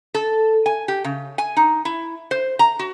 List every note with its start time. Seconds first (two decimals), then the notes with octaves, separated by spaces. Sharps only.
0.14 A4
0.66 G#5
0.88 G4
1.04 C#3
1.38 G#5
1.57 D#4
1.85 E4
2.31 C5
2.59 A#5
2.79 F#4